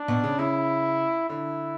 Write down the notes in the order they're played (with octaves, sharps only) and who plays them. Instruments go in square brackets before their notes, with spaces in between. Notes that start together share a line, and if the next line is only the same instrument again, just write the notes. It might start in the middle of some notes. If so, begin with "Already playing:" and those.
Already playing: [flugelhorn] D4
[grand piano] B2
C#3
[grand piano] C#3 [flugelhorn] E4
[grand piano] D3 [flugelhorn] E4